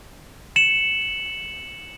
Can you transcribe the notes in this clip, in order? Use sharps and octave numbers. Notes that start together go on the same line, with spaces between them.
C#7 E7 F#7